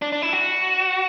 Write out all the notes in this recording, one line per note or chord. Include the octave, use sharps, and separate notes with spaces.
D4
D4
E4
F#4